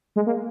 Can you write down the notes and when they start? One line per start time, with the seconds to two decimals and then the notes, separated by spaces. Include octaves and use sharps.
0.16 G#3
0.27 A#3